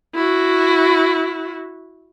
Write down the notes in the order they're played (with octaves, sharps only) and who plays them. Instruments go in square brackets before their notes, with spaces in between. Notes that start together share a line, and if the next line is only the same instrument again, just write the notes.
[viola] E4 F#4